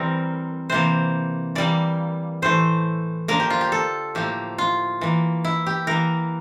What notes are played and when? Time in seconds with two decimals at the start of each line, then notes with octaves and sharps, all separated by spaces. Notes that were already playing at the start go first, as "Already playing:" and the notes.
Already playing: E3 G3 C4 A#4
0.70 C3 E3 A#3 C5
1.55 E3 G3 A#3 D5
2.42 A2 E3 A3 C5
3.28 D3 F3 A#3 A#4
3.40 G4
3.50 F4
3.61 G4
3.72 A4
4.15 A2 F3 A#3 G4
4.58 F4
5.01 E3 A#3
5.45 E4
5.67 G4
5.87 E3 A#3 A#4